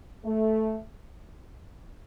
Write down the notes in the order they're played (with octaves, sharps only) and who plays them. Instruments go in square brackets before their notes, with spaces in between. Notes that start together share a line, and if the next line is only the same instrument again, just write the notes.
[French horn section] A3